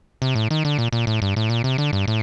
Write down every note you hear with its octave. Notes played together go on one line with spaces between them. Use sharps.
C3
A2
D#3
D3
A#2
A#2
A2
G2
A2
A#2
C3
D3
G2
A2